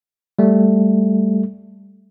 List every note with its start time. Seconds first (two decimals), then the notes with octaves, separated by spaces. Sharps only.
0.39 G3 A3